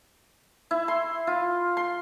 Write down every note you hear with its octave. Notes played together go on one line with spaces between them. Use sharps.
E4
C6
F4
C6